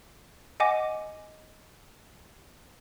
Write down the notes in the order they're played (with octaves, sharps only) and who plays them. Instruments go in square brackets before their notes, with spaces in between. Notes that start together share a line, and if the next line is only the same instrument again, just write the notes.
[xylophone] D#5 F#5 G#5 D6 A#6